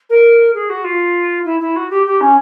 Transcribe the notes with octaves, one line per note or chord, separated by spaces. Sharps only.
A#4
G#4
F#4
F4
E4
E4
F#4
G4
G4
C#4